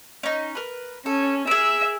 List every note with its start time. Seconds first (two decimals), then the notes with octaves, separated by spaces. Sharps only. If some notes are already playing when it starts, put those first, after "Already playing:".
0.23 C#4 D#4
0.55 A#4 B4
1.06 C#4 A4
1.47 G#4 A#4 E5